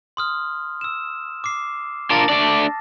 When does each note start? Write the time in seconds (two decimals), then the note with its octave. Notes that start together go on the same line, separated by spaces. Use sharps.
0.17 C6 D#6 F6
0.81 E6 E7
1.44 D6 C7
2.10 D4 F4 A#4 A5 A6 A#6
2.29 A3 D4 D5